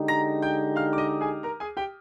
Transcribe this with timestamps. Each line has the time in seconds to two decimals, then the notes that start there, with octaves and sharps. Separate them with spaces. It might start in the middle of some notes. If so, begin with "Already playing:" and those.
Already playing: D3 G#3 D#4 G4
0.08 A#5 A#6
0.42 G5 G6
0.76 F5 F6
0.93 D6
0.98 D#5 D#6
1.21 G#4 G#5
1.43 A#4 A#5
1.60 G#4 G#5
1.77 G4 G5